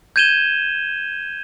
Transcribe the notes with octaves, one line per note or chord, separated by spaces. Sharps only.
G6 G#6 D#7 E7 G7